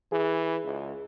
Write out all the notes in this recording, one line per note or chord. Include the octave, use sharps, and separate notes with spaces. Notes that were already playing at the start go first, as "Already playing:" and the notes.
E3 G#4
C#2